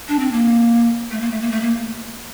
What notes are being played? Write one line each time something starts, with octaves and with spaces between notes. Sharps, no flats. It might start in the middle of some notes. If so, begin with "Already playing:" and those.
D4
C4
A#3
A3
A#3
A3
A#3
A3
A#3